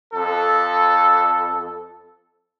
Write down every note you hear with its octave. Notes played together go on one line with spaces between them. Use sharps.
F2 A4